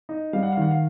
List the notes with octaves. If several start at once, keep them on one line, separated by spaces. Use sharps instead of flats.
D#4
G3 F5
F#5
F5
D#3 F#5
F5